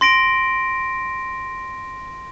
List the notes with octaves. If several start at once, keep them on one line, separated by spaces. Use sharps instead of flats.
C6 A#6 D7